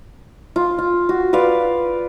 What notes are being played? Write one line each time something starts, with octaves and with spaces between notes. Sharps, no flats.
F4
F4
F#4
F4 B4 D5 F5